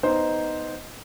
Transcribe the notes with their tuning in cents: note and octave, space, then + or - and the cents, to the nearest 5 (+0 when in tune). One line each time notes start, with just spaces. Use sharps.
B3 +10 D#4 +0 C5 +0